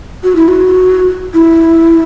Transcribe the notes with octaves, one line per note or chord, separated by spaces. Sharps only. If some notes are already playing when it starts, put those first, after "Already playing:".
F#4
E4
F#4
E4